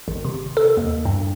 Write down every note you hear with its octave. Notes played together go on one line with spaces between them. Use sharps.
G#1
C3
A4
D#2
G2